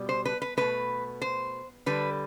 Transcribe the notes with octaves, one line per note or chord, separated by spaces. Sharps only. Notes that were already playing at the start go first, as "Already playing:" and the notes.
Already playing: B2 G3
C5
B4
B4
B2 A3 B4
C5
D3 G3 B4